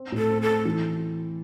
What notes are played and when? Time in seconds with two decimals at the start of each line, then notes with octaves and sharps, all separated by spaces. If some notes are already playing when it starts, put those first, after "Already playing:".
Already playing: C4
0.12 A2
0.18 A4
0.29 C4
0.42 A4
0.47 C4
0.65 E3